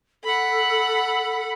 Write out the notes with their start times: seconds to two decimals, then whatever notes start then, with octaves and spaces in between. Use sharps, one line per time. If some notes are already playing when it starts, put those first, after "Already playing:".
0.24 A4 F#5 B5